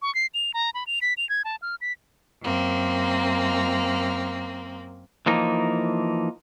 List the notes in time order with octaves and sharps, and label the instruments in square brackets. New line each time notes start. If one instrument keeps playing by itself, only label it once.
[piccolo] C#6
C7
F7
A#5
B5
F7
B6
F7
G#6
A5
F6
B6
[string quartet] F#2 A#3 C4
[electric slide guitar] E3 F3 A#3 D#4